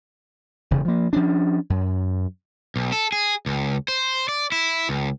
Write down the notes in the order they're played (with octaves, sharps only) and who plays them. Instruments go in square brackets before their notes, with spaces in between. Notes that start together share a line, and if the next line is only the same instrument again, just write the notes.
[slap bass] E1 C#3
F3 A#3
F3 C#4 D4
F#2
[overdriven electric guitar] B1
A4
G#4
C#2
C5
D5
E4
C#2